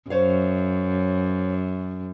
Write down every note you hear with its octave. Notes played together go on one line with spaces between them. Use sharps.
F#2 C5 C#5 F5